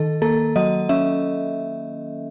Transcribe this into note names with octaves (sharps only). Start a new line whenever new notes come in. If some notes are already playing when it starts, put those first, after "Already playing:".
Already playing: D#3 A4
A#3 A4
F#3 D#5
C#4 E5